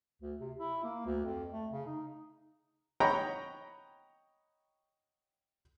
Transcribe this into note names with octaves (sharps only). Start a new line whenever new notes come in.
D2
C3
E4
A#3
D2
F2
A3
C#3
D#4
C#5 D#5 F#5 G5 A#5 B5